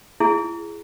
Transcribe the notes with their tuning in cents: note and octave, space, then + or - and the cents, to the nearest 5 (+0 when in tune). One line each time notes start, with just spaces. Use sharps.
E4 +40 G#4 +0